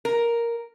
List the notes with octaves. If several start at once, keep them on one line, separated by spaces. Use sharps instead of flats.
A#4